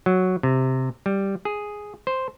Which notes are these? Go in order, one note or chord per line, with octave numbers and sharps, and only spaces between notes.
F#3
C3
G3
G#4
C5